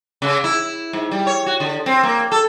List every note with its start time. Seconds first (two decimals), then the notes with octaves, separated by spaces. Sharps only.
0.22 C#3
0.44 E4
0.93 G#2
1.11 G3
1.27 C#5
1.46 F#4
1.60 D3
1.86 C4
2.03 A#3
2.32 A4